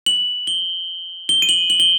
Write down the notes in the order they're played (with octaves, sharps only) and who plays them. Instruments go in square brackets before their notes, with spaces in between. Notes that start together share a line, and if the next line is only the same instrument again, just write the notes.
[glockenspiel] F#7
G7
G7
D#7
F#7
F#7
G7